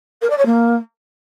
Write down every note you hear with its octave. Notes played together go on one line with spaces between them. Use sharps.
A#4
D5
C#5
A#3